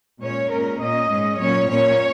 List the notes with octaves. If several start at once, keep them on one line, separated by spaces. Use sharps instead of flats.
A#2 G#3 C#4 C#5
A#2 G#3 C#4 A#4
A#2 A#3 C#4 D#5
G#2 G#3 C#4
A#2 F#3 C#4 C#5
A#2 A#3 C#4 C#5